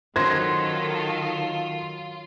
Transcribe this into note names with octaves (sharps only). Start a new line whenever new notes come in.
D#3 F#3 C#4 F4 A4 C5 G#6 A#6